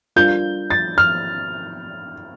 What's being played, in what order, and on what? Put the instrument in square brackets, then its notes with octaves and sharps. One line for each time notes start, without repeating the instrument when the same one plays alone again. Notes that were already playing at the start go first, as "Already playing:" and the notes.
[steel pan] G3 D4 F4 A#4 [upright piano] G6
[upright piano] A6
F6